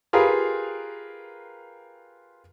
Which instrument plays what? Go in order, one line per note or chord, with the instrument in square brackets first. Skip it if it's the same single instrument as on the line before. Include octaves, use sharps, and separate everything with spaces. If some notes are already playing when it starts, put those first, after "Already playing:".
[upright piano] F4 G4 G#4 A#4 B4 F5